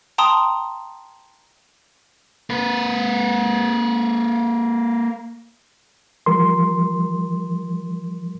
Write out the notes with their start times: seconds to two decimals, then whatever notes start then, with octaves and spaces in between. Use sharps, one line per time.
0.18 G5 A5 A#5 C6 D#6
2.50 A#3 B4
6.26 E3 F3 G3 A#4 C6